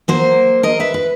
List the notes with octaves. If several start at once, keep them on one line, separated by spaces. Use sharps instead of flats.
F#3 A#3 C5
A#4 D#5
B4 E5
B4